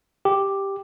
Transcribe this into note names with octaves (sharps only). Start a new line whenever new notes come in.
G4